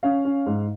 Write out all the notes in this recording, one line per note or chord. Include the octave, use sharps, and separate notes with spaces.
C#4 F5
C#4
G#2